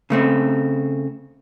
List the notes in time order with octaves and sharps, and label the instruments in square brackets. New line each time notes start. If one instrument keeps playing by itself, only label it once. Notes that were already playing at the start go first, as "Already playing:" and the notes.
[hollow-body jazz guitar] C#3 A3 C4